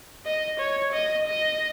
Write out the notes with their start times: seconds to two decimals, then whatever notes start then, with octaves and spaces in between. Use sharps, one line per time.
0.25 D#5
0.59 C#5
0.92 D#5
1.27 D#5